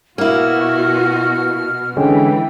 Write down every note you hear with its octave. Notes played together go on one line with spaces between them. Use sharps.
B2 A#3 E4 F#4 F6
D3 E3 G#3 C#4 G5